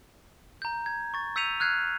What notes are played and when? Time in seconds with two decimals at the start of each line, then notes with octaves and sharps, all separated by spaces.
0.62 A#5 G6
0.86 G#6
1.14 C#6 A6
1.36 E6 G6 B6 C#7 D#7 F7
1.60 F6 F#6 G#6 C7 F7